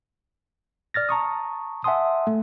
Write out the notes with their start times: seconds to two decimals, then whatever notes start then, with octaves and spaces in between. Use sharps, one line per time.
0.94 D5 F6 A6 A#6
1.09 A5 A#5 C#6 D#6
1.84 E5 F#5 G#5 A5 C6 D#6
2.27 A3